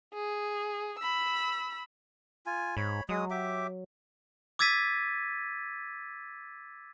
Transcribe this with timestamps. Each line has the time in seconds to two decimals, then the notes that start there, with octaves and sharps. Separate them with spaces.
0.14 G#4
0.99 B5 E6
2.46 F4 G#5
2.77 G#2 C#5 B5
3.09 F#3 G#3 D#6
3.31 G4 E5 D6
4.59 D6 E6 G#6 A6 B6 D#7